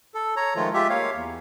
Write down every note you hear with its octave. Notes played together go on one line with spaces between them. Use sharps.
A4
C#5 A#5
D#3 F3 G#3 A3 F4
G#3 F4 G4 E5
A#3 C#5 F5
E2